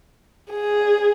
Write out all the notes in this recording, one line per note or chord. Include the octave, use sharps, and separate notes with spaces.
G#4